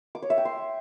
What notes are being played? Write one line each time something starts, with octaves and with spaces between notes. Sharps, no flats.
D6
C#5
E5
G5
C6